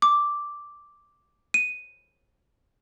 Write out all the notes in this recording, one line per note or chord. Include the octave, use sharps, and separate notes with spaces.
D6
D#7